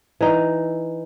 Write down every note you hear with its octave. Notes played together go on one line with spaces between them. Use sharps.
E3 D#4